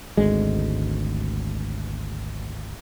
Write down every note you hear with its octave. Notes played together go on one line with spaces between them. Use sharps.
G#1 D2 G#3